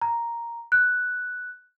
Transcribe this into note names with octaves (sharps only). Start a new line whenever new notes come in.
A#5
F#6